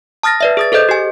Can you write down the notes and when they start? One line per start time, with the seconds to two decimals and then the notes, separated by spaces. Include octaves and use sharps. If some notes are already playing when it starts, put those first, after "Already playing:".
0.23 A5 D#6 F6 A6 A#6
0.41 B4 D5 E5
0.57 G#4 D#6 A6
0.72 G#4 A4 C5 D#5 G6
0.89 G4 G#5